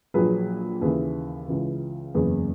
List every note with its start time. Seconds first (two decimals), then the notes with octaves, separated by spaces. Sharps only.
0.14 A#1 A#2 F#3 G#4 B4
0.81 D#2 C#3 E3 G#4 B4
1.48 C#2 C#3 E3
2.14 F#1 E2 C#3 G#4 B4